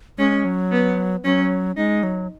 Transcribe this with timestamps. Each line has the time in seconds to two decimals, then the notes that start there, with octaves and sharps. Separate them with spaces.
0.18 G#3 C#4
0.45 F#3
0.71 B3
1.24 F#3 C#4
1.77 G#3 D#4
2.03 F#3